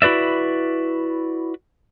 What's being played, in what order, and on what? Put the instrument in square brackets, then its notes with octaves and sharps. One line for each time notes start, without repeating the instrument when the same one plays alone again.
[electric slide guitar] E4 F#4 B4 D5 E5